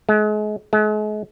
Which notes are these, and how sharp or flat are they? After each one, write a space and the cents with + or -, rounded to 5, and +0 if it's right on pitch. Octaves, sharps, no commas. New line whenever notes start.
G#3 +35
G#3 +40